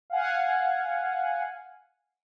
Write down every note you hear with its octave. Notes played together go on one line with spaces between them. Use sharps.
F5 F#5 G#5